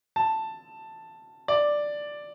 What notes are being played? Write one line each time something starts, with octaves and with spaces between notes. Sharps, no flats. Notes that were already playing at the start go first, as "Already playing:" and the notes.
A5
D5